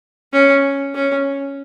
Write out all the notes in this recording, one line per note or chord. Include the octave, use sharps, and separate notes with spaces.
C#4
C#4